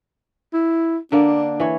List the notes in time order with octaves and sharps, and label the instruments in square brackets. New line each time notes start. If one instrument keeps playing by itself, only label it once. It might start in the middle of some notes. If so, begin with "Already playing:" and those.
[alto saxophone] E4
[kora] D3 A#3 D5 [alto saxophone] D4
[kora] E3 C#5